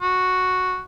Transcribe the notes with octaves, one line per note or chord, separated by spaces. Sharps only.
F#4